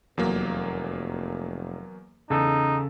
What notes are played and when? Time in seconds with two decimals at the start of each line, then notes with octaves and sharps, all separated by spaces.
0.18 F1 E2 F#3 A#3
2.30 E2 C#3 D#4 A4